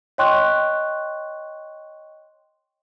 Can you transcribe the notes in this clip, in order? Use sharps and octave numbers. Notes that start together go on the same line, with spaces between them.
C#5 D#5 G5 C6 C#6 F#6